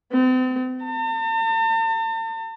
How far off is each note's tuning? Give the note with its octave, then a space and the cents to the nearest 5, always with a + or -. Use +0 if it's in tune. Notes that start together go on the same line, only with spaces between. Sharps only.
C4 -40
A5 +45